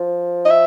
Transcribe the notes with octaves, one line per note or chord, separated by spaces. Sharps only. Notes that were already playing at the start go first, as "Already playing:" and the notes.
Already playing: F3
D#5
E5